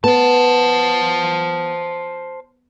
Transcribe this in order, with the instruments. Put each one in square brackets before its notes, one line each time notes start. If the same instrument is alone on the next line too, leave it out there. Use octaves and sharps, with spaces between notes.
[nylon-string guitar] B3 [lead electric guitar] C5 A5